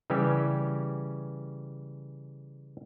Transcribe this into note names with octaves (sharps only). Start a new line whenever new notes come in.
C#3 E3 G3 C#4 G4